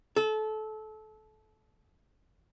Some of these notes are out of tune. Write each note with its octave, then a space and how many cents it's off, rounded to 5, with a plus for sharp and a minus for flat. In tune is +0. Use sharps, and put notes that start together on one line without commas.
A4 -25